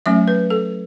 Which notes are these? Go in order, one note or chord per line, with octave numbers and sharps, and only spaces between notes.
F#3 A3 C#4 E5
B4
A4